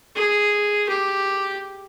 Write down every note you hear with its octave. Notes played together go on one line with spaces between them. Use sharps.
G#4
G4